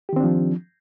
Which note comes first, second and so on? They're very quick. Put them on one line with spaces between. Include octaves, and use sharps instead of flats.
G4 D#3 C4 D4 F3